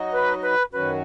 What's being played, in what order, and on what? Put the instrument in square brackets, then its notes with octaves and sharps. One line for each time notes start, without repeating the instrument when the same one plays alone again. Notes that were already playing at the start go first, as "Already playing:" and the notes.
Already playing: [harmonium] F#3 D#4 F#4 D#5
[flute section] B4
B4
[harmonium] F#2 D#3 F#3 C#4 F#4 [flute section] B4